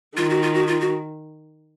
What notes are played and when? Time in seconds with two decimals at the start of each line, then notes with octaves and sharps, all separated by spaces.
0.17 D#3 F4
0.30 F#4
0.43 F4
0.54 F#4
0.67 F4
0.81 F#4